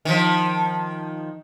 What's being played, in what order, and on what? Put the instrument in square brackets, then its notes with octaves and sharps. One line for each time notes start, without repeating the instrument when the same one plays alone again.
[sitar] D#3 F3